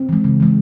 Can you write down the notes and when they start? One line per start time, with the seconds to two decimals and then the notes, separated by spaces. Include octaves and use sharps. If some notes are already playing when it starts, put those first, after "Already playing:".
Already playing: C4
0.09 E3 G#3
0.24 C#3
0.40 E3 G#3